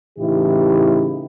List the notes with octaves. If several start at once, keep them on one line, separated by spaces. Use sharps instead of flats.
A2 C#3 E3 D#4 E4 G4